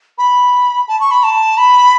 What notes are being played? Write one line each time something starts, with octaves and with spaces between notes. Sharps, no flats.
B5
A5
C#6
B5
A5
B5